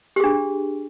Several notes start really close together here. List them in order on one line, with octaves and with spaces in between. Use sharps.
G4 G#4 D4